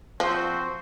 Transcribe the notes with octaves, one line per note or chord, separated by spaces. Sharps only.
F3 C4 F#4 C5